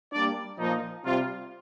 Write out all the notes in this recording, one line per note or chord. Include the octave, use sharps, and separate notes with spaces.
G3 A#3 D4 D5
A#2 F3 A#3 D#4
C3 G3 C4 F4